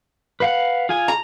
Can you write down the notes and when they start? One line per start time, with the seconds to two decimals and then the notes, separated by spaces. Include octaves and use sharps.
0.40 B4 F5 F#5
0.89 F4 G#4 G#5
1.08 A#5